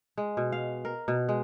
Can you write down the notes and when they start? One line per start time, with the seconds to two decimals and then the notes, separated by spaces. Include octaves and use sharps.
0.18 G#3
0.37 B2
0.52 F5
0.85 A#4
1.08 B2
1.29 G#3